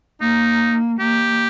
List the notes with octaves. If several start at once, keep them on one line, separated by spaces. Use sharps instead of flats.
A#3 D#4
A#3 G4